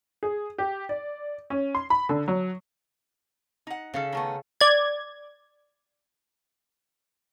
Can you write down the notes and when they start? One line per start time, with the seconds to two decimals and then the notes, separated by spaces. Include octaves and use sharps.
0.23 G#4
0.58 G4
0.89 D5
1.50 C#4
1.75 C6
1.90 B5
2.09 D3
2.28 F#3
3.67 D#4 F#5
3.94 C#3 C#4 A4
4.12 D#3 A3 B3
4.61 D5 G#6